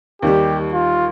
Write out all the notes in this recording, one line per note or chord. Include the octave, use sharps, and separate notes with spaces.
D#2 D#3 G3 G4
F4